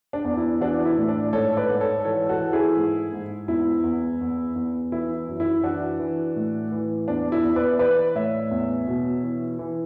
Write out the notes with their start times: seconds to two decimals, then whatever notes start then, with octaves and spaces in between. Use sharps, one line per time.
0.13 D4
0.25 E2
0.37 E4
0.61 E3 D4 F#4
0.85 E4
0.98 A2
1.08 D4
1.33 G#2 A4 C#5
1.57 B4 D5
1.69 G#2
1.80 A4 C#5
2.05 E3 A4 C#5
2.29 F#4 A4
2.40 E3
2.53 E4 G#4
2.77 G#2
3.13 G#2
3.48 E2 E4
3.84 E2
4.21 E2
4.56 E2
4.92 E3 E4
5.29 F#2
5.40 E4
5.63 E3 D4 F#4
5.99 E3
6.36 A2
6.72 E3
7.08 E2 D4
7.32 E4
7.43 E2
7.56 B4 D5
7.79 E3 B4 D5
8.15 A2 C#5 E5
8.51 E2
8.87 B2
9.23 E3
9.59 E3